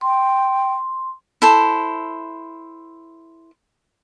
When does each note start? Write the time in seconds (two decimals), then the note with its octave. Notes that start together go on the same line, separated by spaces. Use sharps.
0.01 G5 C6
1.42 E4 A4 C5